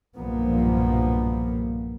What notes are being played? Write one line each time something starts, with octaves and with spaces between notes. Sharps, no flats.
B1 G2 A#2 F3 A#3 B3